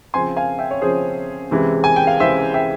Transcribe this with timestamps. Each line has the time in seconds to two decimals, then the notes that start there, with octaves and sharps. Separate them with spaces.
0.14 C#3 F3 C4 G#5 C6
0.37 F5 G#5
0.59 E5 G5
0.71 C#5
0.82 C#3 F3 C4 G#4 C5
1.51 C#2 C3 E3 G#3 E4
1.84 G#5
1.96 G5
2.07 F5
2.20 C#2 C3 E3 G#3 E4 C5 E5
2.54 E5 G5